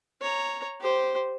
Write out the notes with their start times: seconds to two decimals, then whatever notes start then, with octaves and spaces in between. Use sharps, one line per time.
0.21 C#5 A#5
0.81 G4 C5